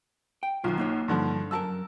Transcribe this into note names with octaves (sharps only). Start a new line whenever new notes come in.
G5
B1 D#3 F4
A#3 D#4 C#5
G2 D3 F3
F#2 F#4 A#4 A5 E6